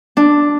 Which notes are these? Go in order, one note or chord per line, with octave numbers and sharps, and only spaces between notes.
D4